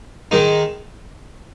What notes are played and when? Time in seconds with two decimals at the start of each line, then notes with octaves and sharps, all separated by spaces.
0.31 D#3 G#3 D#4